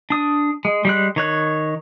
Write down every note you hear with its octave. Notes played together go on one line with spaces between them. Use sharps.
D4 D#6
G#3
G3 G#3 F#6
D#3 C#5 F#6